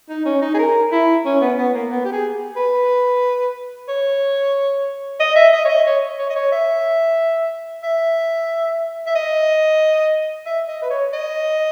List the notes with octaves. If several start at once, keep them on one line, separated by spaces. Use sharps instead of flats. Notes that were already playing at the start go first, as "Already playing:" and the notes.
D#4
C#4
D#4
G#4
A#4
E4
C#4
B3
B3
A#3
B3
G4
G#4
B4
C#5
D#5
E5
D#5
C#5
D#5
C#5
C#5
D#5
C#5
E5
E5
E5
D#5
E5
D#5
B4
C#5
D#5